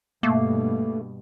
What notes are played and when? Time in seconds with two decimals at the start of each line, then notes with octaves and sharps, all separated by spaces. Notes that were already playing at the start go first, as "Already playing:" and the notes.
0.23 G2 B2 A3 A#3